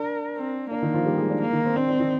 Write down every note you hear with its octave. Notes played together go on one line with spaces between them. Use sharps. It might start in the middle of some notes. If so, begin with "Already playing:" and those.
Already playing: D4 A#4
C4
A#3 D4
D#3 D#4
F3 F4
G3 G4
G#3 G#4
D4
A#3
D#3 D#4
C4
C4 D4
D4
D#3 D#4